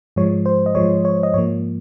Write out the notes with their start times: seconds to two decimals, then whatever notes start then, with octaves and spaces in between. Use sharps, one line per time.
0.16 G#2 F3 G#3 C#5
0.46 C5
0.66 D#5
0.75 G#2 F3 G#3 C#5
1.05 C#5
1.23 D#5
1.34 G#2 F3 A#3 C#5